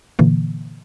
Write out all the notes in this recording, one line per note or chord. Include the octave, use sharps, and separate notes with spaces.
A#2 D3 E3 A#3